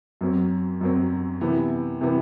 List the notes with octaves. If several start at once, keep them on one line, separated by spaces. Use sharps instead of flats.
F#2 F#3 C4
F#2 F#3 C4
C3 E3 B3
C3 E3 B3